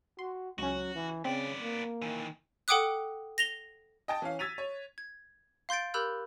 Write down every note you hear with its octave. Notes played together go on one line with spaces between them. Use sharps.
F#4 C6
C#2 F#3 C#4 F#4
E3
C#3 B3 C4 D5
A#3
D#3 E3
A4 F#5 G5 D6 D#6 F#6
A#6 F7 G7
D#5 G5 A5
E3 C#4 F5
E6 G#6 A6 B6 D#7 F7
C#5
G#6
F5 C6 G6 A6 D7
G4 A#4 B5 E6 F#6 G6